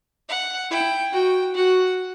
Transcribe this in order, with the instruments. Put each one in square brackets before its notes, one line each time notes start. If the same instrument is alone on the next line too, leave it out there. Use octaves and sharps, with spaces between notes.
[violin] F#5
[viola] E4 [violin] G5
[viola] F#4 [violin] G5
[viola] F#4 [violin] F#5